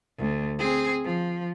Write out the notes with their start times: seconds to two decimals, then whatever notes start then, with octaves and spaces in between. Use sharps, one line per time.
0.19 D2
0.59 C4 G#4
1.04 F3